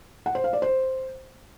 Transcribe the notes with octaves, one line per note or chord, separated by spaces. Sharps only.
F#5
C5
F5
D5
C5